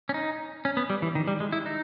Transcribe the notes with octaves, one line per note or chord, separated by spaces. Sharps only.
C#4
D#4
C#4
B3
G3
E3
D#3
G3
G#3
E4
D#4